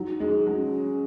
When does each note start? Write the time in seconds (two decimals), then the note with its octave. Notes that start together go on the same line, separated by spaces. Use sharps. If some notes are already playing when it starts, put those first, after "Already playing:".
Already playing: F#3 D#4
0.20 G#3
0.46 F#3 C#4